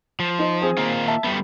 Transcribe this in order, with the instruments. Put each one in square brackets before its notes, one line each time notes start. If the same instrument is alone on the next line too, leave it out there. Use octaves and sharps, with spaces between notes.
[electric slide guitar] F3
[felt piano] D#4 C5
C4 G#4
[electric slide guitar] D#3 A#3 F4
[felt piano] E5 A5
[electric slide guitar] G3 A3 B3